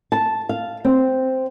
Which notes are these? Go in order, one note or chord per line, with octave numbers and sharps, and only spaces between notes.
A5
F5
C4